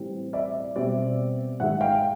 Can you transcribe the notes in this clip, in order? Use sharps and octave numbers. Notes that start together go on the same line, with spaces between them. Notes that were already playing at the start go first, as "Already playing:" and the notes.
Already playing: A2 E3 G3 C4
D5 E5
B2 G3 C4 D5 E5
G#2 D#3 G#3 E5 F#5
F5 G5